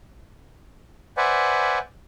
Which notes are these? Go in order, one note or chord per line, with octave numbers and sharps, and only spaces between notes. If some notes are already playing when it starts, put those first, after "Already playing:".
B4 C5 D5 E5 F#5 G#5